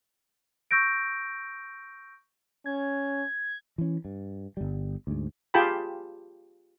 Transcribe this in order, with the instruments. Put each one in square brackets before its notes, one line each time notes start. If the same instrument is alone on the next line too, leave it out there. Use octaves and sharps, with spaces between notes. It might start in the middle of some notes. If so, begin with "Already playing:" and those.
[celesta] C#6 E6 G6 A#6 D7
[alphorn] C#4 [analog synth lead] G#6
[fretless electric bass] E3 C#4
G2
G1 G3
D2 G#2
[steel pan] F4 G4 G#4 G5 A5 B5